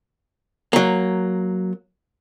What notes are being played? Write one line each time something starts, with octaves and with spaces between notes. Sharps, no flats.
F#3 A#3